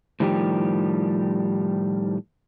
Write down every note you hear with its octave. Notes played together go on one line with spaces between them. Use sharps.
A2 D#3 F3 G3 G4